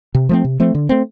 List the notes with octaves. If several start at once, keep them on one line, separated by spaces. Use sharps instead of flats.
C3
F3 A3 C4
C3
F3 A3 C4
D3
A3 C4